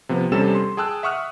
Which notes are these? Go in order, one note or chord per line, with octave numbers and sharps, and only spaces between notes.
C3 F3 B3
E2 C3 G3 C#4 A4 E7
C6
G#4 G5 A5 E6 F#6
E5 F#5 C#6 D#6 F6 F#6